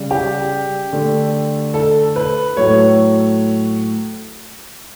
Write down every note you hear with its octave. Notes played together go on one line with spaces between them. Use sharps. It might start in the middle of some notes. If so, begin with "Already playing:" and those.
Already playing: C#3 G3
G4
D3 A3
A4
B4
A2 F#3 A3 C#5